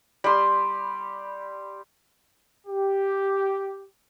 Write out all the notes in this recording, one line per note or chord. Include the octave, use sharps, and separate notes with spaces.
G3 C6
G4